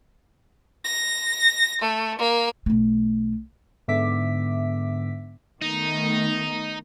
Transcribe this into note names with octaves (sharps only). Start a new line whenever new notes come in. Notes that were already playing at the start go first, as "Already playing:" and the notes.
A#6
A3
A#3
B1 A3
G#2 D3 B3 E5 D6 B6
D#3 A3 B3 D#4